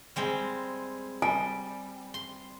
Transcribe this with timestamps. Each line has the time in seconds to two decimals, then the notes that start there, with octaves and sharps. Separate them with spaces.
0.16 G3 G#3 C4
1.22 G3 G#5
2.14 C6